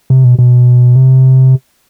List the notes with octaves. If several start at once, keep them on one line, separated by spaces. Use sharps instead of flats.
C3
B2
B2
C3